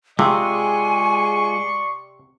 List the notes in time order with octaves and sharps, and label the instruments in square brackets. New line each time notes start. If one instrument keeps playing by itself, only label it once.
[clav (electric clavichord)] C3 [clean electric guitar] G#3 F4 G#4 [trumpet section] D5 C6 C#6 [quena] G#5